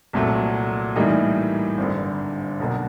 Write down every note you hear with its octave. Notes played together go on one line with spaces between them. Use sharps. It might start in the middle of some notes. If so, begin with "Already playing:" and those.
C2 A#2 F#3 A3
A2 E3 G3 A#3 D#4
G#1 G2 D3
B1 B2 F#3 A#3